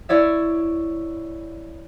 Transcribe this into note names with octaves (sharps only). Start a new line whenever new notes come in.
E4 C#5 D5 E5